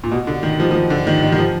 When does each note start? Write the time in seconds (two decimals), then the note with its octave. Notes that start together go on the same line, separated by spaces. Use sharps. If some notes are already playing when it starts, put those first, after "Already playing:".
0.04 A#2
0.11 B2
0.27 D3
0.43 D#3
0.60 F3
0.71 F3
0.76 D#3
0.90 D3
1.07 D#3
1.22 D#3
1.32 D#3
1.38 F3